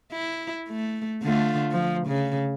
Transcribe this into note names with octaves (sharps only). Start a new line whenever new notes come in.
E4
A3
D3 A3 F4
F3
C#3